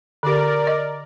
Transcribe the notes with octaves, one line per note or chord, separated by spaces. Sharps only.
D3 G4 A#4 D5
D#5